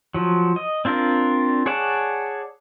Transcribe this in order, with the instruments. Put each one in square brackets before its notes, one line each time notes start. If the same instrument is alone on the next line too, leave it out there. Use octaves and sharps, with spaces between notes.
[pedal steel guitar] F3 F#3
D#5
C4 D4 F4 A#4
G#4 C#5 D5 F#5 A5